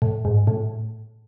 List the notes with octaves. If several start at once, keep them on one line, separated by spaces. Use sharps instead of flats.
A2
G#2
A2